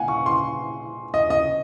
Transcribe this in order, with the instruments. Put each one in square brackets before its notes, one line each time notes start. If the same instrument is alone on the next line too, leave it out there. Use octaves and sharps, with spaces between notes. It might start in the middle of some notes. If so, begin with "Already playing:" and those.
Already playing: [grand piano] A#2 F5 F#5 G#5
C#6
C6
D#5
D#5